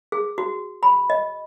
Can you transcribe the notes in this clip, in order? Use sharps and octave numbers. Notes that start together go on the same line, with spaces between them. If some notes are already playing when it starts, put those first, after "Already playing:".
G#4
F#4
B5
D#5